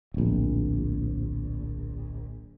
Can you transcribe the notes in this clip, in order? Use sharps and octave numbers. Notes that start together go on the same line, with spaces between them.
D1 A#1